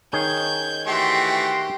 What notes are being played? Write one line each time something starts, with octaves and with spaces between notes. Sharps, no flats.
D#3 G#4 C#5 G6 G#6
E3 A3 F#4 G4 G5 C6